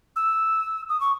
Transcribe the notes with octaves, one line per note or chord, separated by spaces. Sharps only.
E6
D#6
C#6